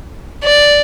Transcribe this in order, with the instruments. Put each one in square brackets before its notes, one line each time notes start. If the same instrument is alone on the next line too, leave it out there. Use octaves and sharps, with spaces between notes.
[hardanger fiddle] D5